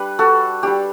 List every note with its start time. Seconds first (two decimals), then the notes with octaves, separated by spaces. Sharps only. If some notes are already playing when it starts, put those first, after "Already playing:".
Already playing: G3 D4 B4
0.19 F#4 A4
0.63 G3 D4 G4